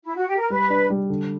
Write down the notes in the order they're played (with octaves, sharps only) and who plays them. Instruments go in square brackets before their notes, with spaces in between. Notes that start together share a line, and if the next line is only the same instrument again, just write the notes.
[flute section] E4
F#4
G4
A#4
[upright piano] G3 [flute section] B4
[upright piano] D4
G3
D3